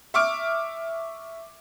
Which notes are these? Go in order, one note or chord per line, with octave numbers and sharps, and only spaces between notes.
E5 C#6 D6 F6 D7